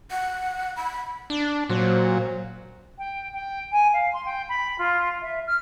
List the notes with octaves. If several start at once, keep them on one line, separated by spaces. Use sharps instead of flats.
F#5
B5
D4
A#2 F#3 C5
G5
G5
G#5
F5
C6
G5
B5
F4
E5
F6